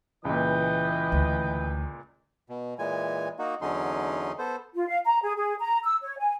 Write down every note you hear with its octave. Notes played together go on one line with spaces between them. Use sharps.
C#2 A#2 E3 B4 D#5 G5
D2
B2
A#2 E3 G#3 G#5
A#3 D#4 F#4
E2 D3 F#3 C#4 D#4 C6
B3 A4 C5
F4
F5
A#5
G#4
G#4
A#5
E6
C#5
G#5